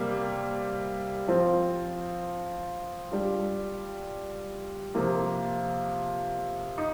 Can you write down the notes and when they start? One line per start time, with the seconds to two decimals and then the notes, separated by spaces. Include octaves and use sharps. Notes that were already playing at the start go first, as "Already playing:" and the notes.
Already playing: C3 G3 A#3
1.28 F3 C4 F4
3.11 G3 D4 F4
4.95 C3 F3 A#3 F4
6.78 D#4